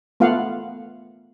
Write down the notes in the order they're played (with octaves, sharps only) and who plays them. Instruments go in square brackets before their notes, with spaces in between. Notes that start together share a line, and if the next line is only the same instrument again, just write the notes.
[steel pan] A3 B3 F4 F5 F#5